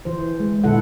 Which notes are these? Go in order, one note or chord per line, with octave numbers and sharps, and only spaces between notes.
E3 C5
G#3
A#2 D3 E4 A4 F#5